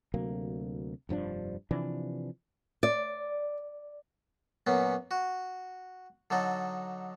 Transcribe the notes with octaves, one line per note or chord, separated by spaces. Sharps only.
D2 C3 F#3 A#3
F1 G2 F3 D4
C3 E3 F3 D4
D5
F#2 A#2 B3 C#4
F#4
D3 F#3 D#4 A4